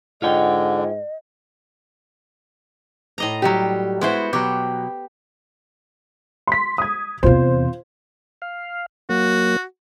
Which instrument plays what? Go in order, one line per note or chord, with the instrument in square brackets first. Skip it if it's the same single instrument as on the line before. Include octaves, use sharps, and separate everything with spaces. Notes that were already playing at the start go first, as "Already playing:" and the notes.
[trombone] G#2 [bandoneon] D3 [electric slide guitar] F4 C#5 G5 [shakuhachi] D#5
[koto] A2 D#5 A#5
[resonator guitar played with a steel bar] F#3 G3 G4
[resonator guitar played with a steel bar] G#3 E4 [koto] B3 F#4 C5
[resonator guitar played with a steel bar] B2 F#3 [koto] G4
[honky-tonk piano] C6 B6
D#6 G#6
[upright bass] E2 C3 [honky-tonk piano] F4 C5
[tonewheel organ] F5
[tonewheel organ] F#3 A#3 [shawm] F#4